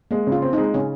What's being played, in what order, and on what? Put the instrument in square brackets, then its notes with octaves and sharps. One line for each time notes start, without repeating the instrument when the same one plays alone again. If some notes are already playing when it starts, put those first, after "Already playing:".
[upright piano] G#3 [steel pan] A#3
[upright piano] C#3
[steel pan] F4
[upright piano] C4
[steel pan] D#4
[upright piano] G#3
[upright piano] C#3 [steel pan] C#4